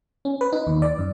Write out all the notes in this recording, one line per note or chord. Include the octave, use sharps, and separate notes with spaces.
C#4
B4
D#4
D#2
D5
F#2